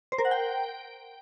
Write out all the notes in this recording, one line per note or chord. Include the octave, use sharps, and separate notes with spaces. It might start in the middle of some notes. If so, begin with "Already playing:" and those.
C5
A#4
F#5
G5